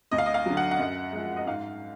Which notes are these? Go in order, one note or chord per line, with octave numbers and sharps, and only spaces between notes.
D2 D#5
F5
D#5
F5
D3 F#3
F#5
F#5
F#2
F3 G#3
D#5
G#2 F5